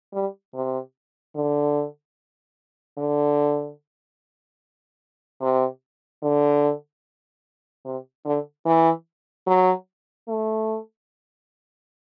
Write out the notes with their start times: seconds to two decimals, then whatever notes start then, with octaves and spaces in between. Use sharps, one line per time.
0.13 G3
0.54 C3
1.35 D3
2.98 D3
5.41 C3
6.23 D3
7.84 C3
8.25 D3
8.65 E3
9.47 F#3
10.28 A3